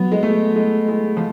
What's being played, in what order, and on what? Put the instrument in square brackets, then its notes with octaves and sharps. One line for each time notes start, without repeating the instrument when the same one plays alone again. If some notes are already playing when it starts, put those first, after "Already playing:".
Already playing: [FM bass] F#3 [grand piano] B3
[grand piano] G#3
A3
G#3
G#3
F3